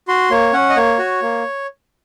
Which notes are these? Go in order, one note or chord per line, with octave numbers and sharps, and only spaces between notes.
F#4 C6
A#3 C#5
C#4 F#5
D#5
A#3 C#5
F#4
A#3